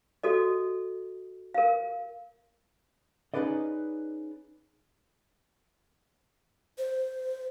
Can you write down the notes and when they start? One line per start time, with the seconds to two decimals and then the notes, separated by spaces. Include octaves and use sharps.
0.23 F#4 A4 D#5
1.54 A#4 F5
3.34 C#4 D#4 G#4 B4 D5 D#5
6.78 C5